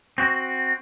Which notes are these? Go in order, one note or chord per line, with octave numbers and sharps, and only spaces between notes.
C4 F#4